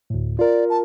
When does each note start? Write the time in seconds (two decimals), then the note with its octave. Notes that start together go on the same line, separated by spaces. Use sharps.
0.10 D2 A2
0.39 F4 A#4 D5
0.70 A5